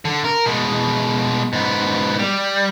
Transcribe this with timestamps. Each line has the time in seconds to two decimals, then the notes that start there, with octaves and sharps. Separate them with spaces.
0.05 D3
0.25 A#4
0.46 B2 G#3
1.53 G#2 B3
2.19 G3